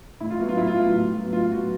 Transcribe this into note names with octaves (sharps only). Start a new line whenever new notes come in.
A2 E4
F4
F#3 B3 F#4
F4
A2 E4
F4
F#3 B3
A2
F#3
B3
A2 F4
F#3 B3 F#4